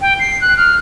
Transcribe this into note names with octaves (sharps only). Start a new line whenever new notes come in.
G5
C7
F#6
F6